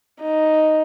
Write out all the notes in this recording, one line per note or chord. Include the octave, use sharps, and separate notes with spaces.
D#4